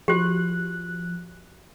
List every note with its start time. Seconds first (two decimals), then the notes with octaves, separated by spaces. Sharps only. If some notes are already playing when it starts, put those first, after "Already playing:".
0.08 F3 F#4 G4 F#6